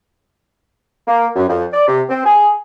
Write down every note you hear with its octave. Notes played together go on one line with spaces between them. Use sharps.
A#3
F#2
F2
D5
C3
C4
G#4